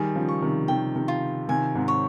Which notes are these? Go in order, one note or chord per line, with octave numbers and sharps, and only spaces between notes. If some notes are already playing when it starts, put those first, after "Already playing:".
Already playing: D#3 G3 G#4
C#3 F3
C#6
C3 D#3
C3 D#3 G5
C3 D#3
F4
C3 D#3 G#5
G#2 C3
C#5